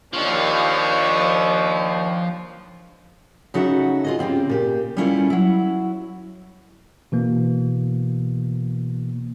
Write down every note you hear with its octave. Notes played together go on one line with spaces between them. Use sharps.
D#2 F3 D4 C#5
C#3 D#4 F#4 A4 E5 F#5
F4 G#4 D#5
C#3 C4 F4 G4
A#2 G4
G3 B3 C#4 E4 F4 A4
F#3 E4
B2 E3 A#3